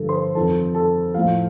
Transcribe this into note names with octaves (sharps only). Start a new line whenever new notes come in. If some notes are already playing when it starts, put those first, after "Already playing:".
Already playing: G2 D3 F3 G4 A4
C5 C6
F2 D#3 A4 A5
A4 A5
A2 F3 F5